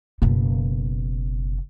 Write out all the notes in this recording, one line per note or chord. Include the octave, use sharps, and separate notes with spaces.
F#1 B2